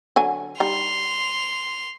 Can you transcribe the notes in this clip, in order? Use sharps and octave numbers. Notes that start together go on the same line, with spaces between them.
D3 F#3 G#5
G3 D#4 C6 F7